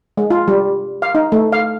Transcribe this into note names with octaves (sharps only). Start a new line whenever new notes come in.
G#3
F4
G3
F5
D#4
A3
F5